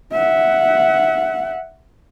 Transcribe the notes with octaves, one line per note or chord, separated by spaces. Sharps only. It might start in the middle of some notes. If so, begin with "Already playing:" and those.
E5 F#5